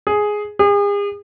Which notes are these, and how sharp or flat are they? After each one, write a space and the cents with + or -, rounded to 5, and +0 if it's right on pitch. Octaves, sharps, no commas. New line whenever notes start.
G#4 +5
G#4 -40